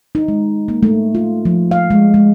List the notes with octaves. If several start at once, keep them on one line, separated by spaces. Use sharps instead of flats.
D#4
G#3
A#3
A3
F4
F3
F5
G#3
G#3